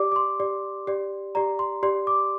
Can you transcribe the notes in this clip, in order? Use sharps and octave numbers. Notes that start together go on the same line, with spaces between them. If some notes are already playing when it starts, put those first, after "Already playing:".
Already playing: G4 D5 D6
D6
C6
G4 D5
G4 D5
G4 D5 A#5
C6
G4 D5 C6
D6